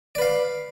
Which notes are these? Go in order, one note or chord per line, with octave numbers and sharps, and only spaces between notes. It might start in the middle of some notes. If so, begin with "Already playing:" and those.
B4 D5 F5